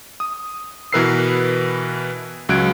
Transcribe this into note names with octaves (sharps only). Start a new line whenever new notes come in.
D#6
B2 E3 A#4 B4 E6 C7
C#2 F#3 F#6 G#6 D7